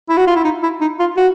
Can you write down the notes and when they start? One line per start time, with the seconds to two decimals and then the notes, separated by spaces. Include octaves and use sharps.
0.09 E4
0.17 F#4
0.27 F4
0.36 E4
0.44 D#4
0.63 E4
0.81 D#4
0.99 F4
1.16 F#4